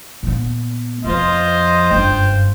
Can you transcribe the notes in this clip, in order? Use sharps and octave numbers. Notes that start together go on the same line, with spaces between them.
A#2 B3
F2 B2 F4 C5 D#5
F#1 G2 G5